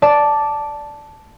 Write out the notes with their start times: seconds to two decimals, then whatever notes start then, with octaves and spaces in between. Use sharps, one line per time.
0.02 D5 A5 D6